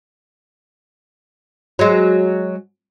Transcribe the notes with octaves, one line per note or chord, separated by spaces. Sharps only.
F#3 G#3